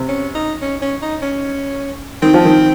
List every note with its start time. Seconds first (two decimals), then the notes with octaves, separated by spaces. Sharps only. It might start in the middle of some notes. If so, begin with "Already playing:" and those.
Already playing: C3
0.09 C#4
0.35 D#4
0.62 C#4
0.82 C#4
1.02 D#4
1.22 C#4
2.22 D#3 C4
2.34 F3
2.45 D#3